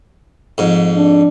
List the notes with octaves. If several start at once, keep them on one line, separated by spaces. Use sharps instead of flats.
F2 G#2
D4